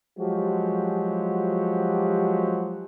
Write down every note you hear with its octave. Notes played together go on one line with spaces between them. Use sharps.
F3 F#3 G#3 F#4 G4